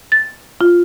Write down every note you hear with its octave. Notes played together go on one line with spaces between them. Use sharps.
A6
F4